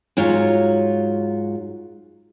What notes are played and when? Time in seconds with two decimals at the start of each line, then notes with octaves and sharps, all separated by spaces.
0.17 G#2 F#3 F4 C#5